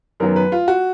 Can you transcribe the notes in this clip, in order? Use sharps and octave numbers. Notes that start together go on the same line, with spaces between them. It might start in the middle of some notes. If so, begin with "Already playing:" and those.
F#2 D#3 F#3 B3 A#4
B4
F4
F#4